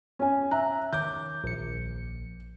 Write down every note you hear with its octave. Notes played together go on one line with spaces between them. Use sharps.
C#4 G#5
E5 A#5 F#6
D#3 C#5 D6 G6
A#1 C#7